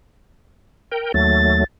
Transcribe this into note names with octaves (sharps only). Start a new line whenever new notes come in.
A#4 G5
D#2 F#3 A3 A6